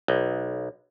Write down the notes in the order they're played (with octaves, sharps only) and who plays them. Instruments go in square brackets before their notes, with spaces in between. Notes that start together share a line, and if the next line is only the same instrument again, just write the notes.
[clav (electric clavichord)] B1